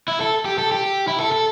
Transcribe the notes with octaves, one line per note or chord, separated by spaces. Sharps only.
E4
A4
G4
A4
G4
E4
A4
A4